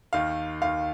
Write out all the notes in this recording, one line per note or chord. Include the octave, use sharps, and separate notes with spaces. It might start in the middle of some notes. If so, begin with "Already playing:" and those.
D#2 D#3 F5
D#2 D#3 F5